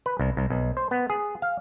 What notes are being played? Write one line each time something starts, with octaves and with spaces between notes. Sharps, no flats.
B4
C2
C2
B1
C5
B3
G#4
F5